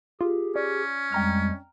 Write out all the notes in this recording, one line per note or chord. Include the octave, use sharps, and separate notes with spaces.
F4 G4 G#4
C#4 D5
F2 G3 G#3 G5 A#5 F6